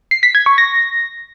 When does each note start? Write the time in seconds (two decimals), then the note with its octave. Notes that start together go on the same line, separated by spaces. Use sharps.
0.11 C7
0.23 B6
0.35 G#6
0.46 C#6
0.58 A#6